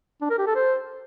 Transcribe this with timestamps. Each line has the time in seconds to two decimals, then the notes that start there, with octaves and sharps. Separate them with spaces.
0.21 D4
0.30 A#4
0.38 G4
0.47 A4
0.55 C5